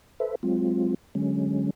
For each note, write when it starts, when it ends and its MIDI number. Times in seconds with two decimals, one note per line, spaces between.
0.20 0.35 69
0.20 0.35 71
0.20 0.35 72
0.20 0.35 76
0.43 0.94 54
0.43 0.94 56
0.43 0.94 60
0.43 0.94 65
1.15 1.70 50
1.15 1.70 54
1.15 1.70 56
1.15 1.70 61